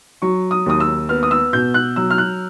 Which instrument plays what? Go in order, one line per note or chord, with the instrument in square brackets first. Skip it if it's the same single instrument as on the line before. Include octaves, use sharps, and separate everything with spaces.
[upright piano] F#3 C#6
D#6
D#2 D#6
E6
B3 F6
D#6
E6
B2 G6
F#6
F#3 E6
F6
F#6